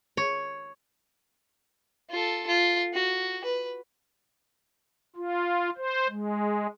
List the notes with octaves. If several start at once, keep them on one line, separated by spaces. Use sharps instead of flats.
C#5
F4 A4
F4
F#4
B4
F4
C5
G#3